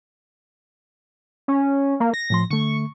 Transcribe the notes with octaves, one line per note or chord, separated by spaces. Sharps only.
C#4
A#3
A#6
A2 F3 C6
D3 A3 C#6